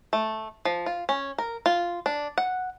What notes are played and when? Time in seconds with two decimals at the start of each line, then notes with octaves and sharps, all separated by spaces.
0.13 A3
0.65 F3
0.86 F4
1.09 C#4
1.38 A#4
1.66 F4
2.06 D4
2.38 F#5